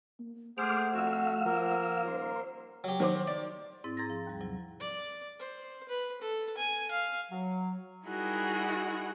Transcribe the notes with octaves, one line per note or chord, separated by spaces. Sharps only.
A#3
A3 G#4 C5 F#5 D6 F6
F2 F#4 F5 E6
F3 A#3 A#4
D#1 C5
F#3 G4
D#3 F#3 C5 D6
D5
G#2 C4 E4 A6
G#4 A#5 C6 A6 A#6
F3
D#2 G3
C3 F3 F#3
D5
C5
B4
A4
G#5
F5
F#3
G3 D#4 E4 F#4 G#4 A#4